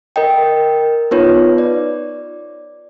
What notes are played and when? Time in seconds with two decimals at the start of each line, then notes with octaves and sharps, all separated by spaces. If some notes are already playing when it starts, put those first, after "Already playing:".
0.16 A#4 D#5 G5
1.11 B3 D#4 F4 B4 C#5
1.58 D5